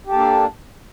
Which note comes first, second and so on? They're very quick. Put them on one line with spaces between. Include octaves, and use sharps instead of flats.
G4 A4 A#3 D4